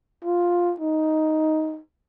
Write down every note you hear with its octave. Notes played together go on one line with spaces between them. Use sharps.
F4
D#4